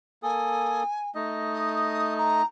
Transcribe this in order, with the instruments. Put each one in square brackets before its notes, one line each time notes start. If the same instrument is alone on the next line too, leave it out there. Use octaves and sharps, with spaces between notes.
[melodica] A#3 A4 D#6 [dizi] G#5
[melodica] A3 D#4 D#5
[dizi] D#6
A#5